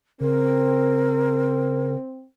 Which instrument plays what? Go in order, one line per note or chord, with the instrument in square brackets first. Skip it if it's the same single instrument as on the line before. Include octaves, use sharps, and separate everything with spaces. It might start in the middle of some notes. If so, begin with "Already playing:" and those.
[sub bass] C#3 [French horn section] C4 [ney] A#4